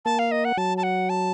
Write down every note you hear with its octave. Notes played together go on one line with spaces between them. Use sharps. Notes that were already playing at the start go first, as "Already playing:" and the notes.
A#3 A5
F5
D#5
F#5
F#3 A5
A5
F#5
A5